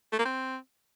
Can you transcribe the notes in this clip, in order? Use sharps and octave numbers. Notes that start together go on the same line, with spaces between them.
A3
A#3
C4